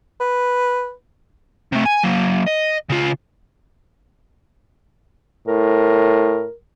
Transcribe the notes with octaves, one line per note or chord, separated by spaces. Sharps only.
B4
C3 A3
G#5
F#3 A#3
D#5
C#3 F4
A2 A#4